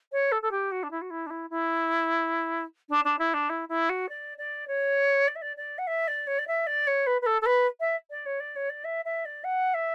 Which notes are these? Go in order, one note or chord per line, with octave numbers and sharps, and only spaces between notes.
C#5
A4
A4
G4
F#4
D4
E4
F#4
E4
D4
E4
E4
D4
D4
E4
D4
E4
E4
F#4
D5
D5
C#5
D5
E5
D5
D5
F#5
E5
D5
C#5
D5
E5
D5
C#5
B4
B4
A4
A4
B4
E5
D5
C#5
D5
C#5
D5
E5
E5
D5
F#5
E5